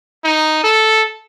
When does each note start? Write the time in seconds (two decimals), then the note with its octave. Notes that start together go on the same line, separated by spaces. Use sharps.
0.24 D#4
0.64 A4